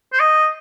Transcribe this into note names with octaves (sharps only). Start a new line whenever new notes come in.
C5
D#5